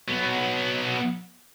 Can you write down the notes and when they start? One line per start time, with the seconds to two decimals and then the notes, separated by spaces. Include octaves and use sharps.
0.08 F#3 B3